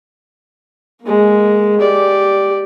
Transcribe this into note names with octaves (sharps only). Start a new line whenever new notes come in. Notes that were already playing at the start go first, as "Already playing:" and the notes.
G#3 A#3
G4 D5